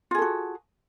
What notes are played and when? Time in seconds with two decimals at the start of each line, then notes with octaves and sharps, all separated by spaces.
0.11 F4
0.15 G#4
0.18 A4
0.22 F#4